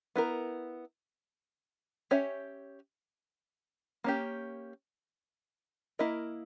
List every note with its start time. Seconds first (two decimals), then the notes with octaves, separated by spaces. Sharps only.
0.16 B3 E4 A#4
2.11 C#4 G4 C#5 E5
4.04 A#3 C#4 G4
5.99 A#3 E4 A#4 D#5